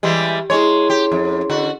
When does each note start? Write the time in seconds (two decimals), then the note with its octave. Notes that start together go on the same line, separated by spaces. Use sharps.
0.03 E3 G3 G#3 G4
0.50 G#3 E4 G#4 C#5 C6
0.90 G4
1.12 F2
1.50 D3 F#4